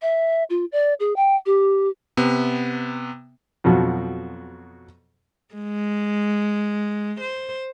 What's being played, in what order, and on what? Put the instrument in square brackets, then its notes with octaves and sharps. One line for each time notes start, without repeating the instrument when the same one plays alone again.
[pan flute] E5
F4
D5
G#4
G5
G4
[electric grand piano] C3 B3
[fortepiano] F2 B2 F3 F#3
[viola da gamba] G#3
C5